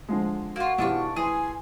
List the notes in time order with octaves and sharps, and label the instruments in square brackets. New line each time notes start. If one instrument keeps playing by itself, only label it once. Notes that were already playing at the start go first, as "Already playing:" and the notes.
[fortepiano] D3 F3 G#3
[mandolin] A#3 F4 [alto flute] F#4
[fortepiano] B1 E3 G4 [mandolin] D4 F4 C#6
[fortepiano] E3 C6 [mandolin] G#4 [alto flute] G#5